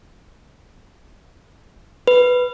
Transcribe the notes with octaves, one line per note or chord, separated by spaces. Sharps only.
B4